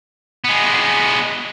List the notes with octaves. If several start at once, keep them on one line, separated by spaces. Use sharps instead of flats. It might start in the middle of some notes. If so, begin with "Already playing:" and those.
G#3 B3